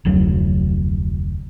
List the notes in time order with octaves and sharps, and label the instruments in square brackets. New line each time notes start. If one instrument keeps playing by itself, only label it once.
[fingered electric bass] F1 D2 F#3